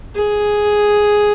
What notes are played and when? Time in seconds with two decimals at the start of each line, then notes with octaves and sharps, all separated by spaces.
0.15 G#4